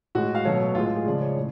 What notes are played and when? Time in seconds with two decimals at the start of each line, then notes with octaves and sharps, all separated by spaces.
0.15 A2 G#3 F#4
0.35 F5
0.44 B2 F#3 A3 C#5
0.75 A2 G#3 F4
0.86 F4
0.96 G#4
1.06 C#3 F3 G#3 D5
1.22 C#5
1.36 A2